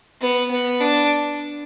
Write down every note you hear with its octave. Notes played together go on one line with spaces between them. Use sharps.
B3
B3
D4